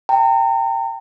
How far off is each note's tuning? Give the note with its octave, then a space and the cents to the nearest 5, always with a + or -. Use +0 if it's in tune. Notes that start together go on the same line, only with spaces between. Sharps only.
G5 +5 A#5 -40